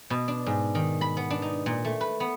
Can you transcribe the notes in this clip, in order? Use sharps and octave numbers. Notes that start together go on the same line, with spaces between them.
B2
D4
G#2
D#3
B5
B3
D4
D#4
A#2
A3
B4
B3